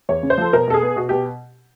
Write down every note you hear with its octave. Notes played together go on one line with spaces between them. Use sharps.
E2 C#5
C#3
C5
F3 A4
B2 A#4
B2 A4
G#4
B3
B2 F#4
B2 G4